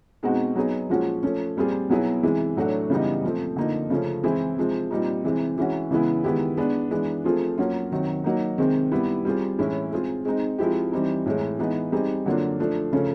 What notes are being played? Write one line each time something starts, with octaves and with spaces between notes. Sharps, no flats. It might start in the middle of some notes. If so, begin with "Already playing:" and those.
B2 G#3 C4 D#4 F#4
F#3 B3 D#4 G#4
A#2 F3 G#3 C#4 F#4
F3 A3 C#4
A#2 G3 C4 F4 G#4
B2 F#3 B3 E4 G#4
C3 E3 G#3
A2 F#3 A3 D4 F#4
C#3 E3 G3 B3 D#4
A#2 F3 A3 C4
D3 F3 A#3 D#4
C#3 F3 A3 C#4
E3 G#3 C4 E4 G#4
C3 F3 G#3 C4
A#2 G3 C4 D#4
C3 E3 G#3 C4
E3 G#3 C#4 F#4
C#3 E3 G#3 B3 E4
D#3 G#3 B3 E4 G4
G#3 B3 D4
E3 G#3 B3 D4
F3 A3 C4 F4 G#4
F#3 A#3 C#4 F4
C3 D#3 F#3
F#3 A#3 D#4
C3 D#3 G#3 C4
G3 B3 E4
G3 C4 F4 G#4
A2 E3 G#3 C#4 E4
G#3 C4 F4 G#4
G#3 C4 D#4
F3 G#3 C4 E4 G4
E3 G3 C4 D#4
A2 E3 G#3
E3 G#3 B3 D#4
G3 C4 D#4 G#4
D3 F#3 A#3 D4 F4
F3 A3 D4
C#3 F3 A3 C#4